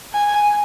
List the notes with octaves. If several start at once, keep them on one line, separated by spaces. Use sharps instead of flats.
G#5